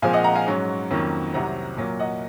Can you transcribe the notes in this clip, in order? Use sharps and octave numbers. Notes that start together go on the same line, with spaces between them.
A#2 F3 G#3 C4 F5 G#5
D#5 F#5
F#5 A#5
F5 G#5
G#2 F#3 C#4
F2 D#3 F#3 A#3 C#4
C2 C3 F#3 C4 F#5 A#5
A#2 F#3 A#3
D#5 F#5